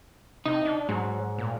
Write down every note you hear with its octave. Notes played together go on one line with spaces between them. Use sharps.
C3 D#4
D4
G#2 F#3
A#2